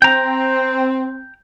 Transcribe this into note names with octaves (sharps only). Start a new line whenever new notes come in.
C4 G5 A#5